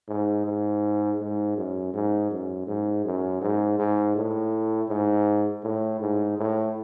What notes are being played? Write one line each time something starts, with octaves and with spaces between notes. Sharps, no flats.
G#2
G#2
G#2
F#2
G#2
F#2
G#2
F#2
G#2
G#2
A2
G#2
A2
G#2
A2